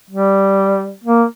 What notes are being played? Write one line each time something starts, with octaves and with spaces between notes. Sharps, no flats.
G3
A#3